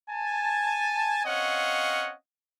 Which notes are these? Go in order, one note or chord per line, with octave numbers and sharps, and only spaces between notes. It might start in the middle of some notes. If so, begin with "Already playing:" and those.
G#5 A5
C4 C#4 C#5 D#5 F5 F#5